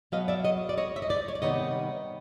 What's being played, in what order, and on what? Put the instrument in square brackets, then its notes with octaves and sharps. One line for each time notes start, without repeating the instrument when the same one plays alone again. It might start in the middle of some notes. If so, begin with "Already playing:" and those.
[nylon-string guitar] B2 F#3 B3 D#5 F5
D5 E5
C#5 D#5
D5
C#5 D#5
E5
D#5
C5 D5
C#5
D5
C3 D#3 G3 B3 C#5 D#5